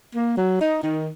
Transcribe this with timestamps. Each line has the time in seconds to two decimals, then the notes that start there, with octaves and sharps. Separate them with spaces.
0.15 A#3
0.38 F#3
0.60 D#4
0.83 D#3